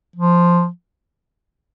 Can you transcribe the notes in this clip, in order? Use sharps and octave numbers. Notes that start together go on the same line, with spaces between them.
F3